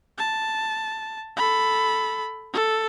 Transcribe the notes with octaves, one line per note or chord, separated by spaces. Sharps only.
A5
A4 B5
A4